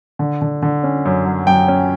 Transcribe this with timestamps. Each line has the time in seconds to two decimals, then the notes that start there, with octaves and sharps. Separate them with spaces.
0.19 D3
0.42 D3
0.62 D3
0.83 C#4
1.05 F#2
1.26 F#3
1.47 F#2 G5
1.68 C#4